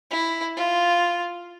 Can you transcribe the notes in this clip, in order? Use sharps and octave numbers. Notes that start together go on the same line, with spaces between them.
E4
F4